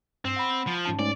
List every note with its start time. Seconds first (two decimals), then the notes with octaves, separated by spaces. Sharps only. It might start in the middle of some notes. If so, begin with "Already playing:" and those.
0.25 G2 C4
0.36 F#5 B5
0.67 F3
0.85 G#2 C#4 A5
0.99 G#2 A3 C#4 D5